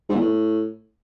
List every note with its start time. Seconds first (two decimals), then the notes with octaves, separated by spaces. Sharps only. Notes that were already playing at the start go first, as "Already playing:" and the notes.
0.09 G#2
0.15 E2
0.20 A2